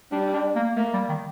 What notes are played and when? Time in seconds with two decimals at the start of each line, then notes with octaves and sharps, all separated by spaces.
0.12 G3 D4
0.33 D4
0.55 A#3
0.76 A3 A#3
0.93 G3
1.09 D#3